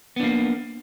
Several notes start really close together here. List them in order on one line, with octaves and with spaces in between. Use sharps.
B3 D4 A#3